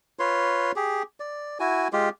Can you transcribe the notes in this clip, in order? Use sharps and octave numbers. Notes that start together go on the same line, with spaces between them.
F4 B4 C#5 C6
G4 G#4
D5
E4 F#4 G#5
G#3 F4 G4